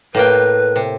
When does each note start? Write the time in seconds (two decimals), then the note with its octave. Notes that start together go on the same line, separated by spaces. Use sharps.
0.15 A2 A#3 B4 G5
0.76 C3